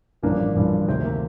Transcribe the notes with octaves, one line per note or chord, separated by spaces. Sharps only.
A1 G2 D3 F3 A#3 D4
A1 G2 D3 F3
D2 C3 D#3 C4
A#3